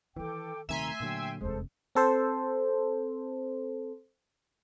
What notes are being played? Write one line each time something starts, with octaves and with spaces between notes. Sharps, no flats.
D#3 E3 F4 A4 G5 D6
D#1 C3 D#3 A3 E5 G#5 A#5 C6
A#2 D3 F#3 G5 E6
F1 E2 G#3 A4 C5
C4 A4 C5